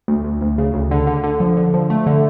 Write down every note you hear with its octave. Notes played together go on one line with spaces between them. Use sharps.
D2
D2
D2
C#3
D2
D3
D3
D3
F3
D3
F3
A3
D3